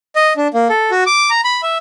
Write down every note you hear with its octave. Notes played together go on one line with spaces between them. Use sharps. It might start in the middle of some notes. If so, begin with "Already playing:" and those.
D#5
D4
A#3
A4
F#4
D6
A#5
B5
E5